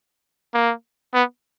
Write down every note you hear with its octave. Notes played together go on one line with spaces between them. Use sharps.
A#3
B3